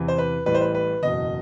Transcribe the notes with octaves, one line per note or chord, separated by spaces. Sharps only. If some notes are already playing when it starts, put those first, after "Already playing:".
Already playing: E2 C3 E3
C5
B4
A1 A2 E3 G3 B4
C5
B4
B4
F#1 E2 B2 D#5